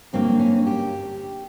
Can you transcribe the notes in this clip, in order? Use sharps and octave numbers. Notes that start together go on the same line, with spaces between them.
G2 D3 F#3 A#3 C4
C#4
G4